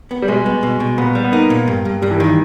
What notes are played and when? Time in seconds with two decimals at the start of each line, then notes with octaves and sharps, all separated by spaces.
0.11 B3
0.22 G3
0.28 B2 G#3
0.46 B3
0.63 B2
0.80 B2
0.98 A#2 B3
1.15 G3
1.24 B3
1.32 A#3 D#4
1.50 A#2
1.68 G2
1.85 G2
2.02 G2 G3
2.11 E3
2.18 D#3 G3